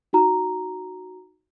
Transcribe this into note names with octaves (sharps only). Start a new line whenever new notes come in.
D#4 F#4 A#5